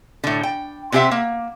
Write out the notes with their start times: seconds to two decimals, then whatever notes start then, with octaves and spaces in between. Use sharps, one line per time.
0.24 A2 D3
0.43 G5
0.92 C3 C4 G4 G#4 E5 F#5
1.11 A#3